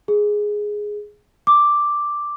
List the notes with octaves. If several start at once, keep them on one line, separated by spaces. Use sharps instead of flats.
G#4
D6